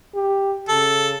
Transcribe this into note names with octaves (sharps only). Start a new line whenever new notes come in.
G4
C#3 A4